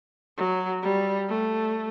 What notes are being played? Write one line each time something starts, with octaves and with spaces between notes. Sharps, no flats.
F#3
G3
A3